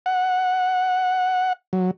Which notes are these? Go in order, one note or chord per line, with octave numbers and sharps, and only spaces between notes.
F#5
F#3